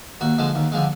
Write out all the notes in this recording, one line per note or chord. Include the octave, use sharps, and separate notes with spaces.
D#2 F#4
D3 F3 G#3
D#2
D3 F3 G#3